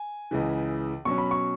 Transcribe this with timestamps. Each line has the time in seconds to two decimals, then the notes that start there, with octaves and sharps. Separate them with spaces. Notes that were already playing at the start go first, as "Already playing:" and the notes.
Already playing: G#5
0.31 C#2 C#3 E3
1.05 B2 F#3 C#4 C#6
1.18 B5
1.31 C#6